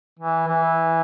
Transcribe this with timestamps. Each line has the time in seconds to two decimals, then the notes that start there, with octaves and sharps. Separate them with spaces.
0.19 E3
0.48 E3